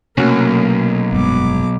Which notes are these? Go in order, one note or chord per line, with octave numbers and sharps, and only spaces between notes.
B1 C3 F#3 A3 A#3 C#4
F1 G2 G#3 B3 D6